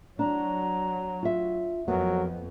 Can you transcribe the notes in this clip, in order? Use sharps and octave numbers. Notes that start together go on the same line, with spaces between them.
F#3 D4 A#5
F4 E5
F2 F#3 B3 A#4